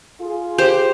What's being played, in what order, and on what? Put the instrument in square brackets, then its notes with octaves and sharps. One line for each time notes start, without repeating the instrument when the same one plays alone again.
[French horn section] F4 G#4
[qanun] G4 C5